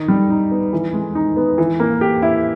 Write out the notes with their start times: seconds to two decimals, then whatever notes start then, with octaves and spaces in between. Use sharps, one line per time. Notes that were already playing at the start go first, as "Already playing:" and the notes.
Already playing: D#3 D#4
0.08 G3
0.30 D#4
0.51 B3
0.73 E3
0.93 G#3
1.15 D#4
1.36 B3
1.58 E3
1.80 A#3
2.01 G4
2.22 E4